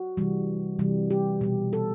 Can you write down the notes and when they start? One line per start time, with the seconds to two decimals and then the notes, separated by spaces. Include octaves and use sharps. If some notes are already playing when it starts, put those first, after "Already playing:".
Already playing: F#4
0.17 C3 E3 G3
0.79 C3 E3 G3
1.10 G4
1.41 B2 G3
1.73 A4